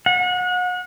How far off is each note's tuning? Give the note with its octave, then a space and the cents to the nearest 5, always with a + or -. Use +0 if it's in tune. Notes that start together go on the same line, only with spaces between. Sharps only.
F#5 -35